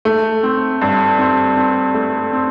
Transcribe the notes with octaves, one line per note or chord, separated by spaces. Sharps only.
A3
C4
G2
C4
C4
A3
C4